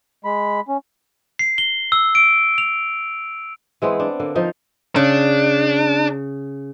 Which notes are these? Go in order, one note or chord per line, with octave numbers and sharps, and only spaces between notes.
G#3 B5
C#4
C7
G7
E6
D7
F7
E3 G#3 B3 C4
D4
D3 A#3
F3 D#4
C#3 D4